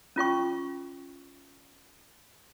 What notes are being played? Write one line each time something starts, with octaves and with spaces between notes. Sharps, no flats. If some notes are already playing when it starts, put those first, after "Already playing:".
C#4 F4 G5 C#6